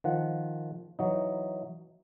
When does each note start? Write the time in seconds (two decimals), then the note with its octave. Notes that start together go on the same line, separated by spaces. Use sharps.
0.04 D#3 F3 F#5
0.99 E3 F#3 D#4